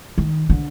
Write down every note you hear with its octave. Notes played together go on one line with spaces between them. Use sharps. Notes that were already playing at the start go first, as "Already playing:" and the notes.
D#3
D3